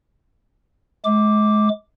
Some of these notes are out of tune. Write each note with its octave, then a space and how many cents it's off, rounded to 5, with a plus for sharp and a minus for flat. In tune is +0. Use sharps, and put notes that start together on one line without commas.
G#3 +35 D6 +0